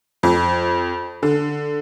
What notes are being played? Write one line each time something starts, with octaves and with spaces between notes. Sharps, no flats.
F2
D3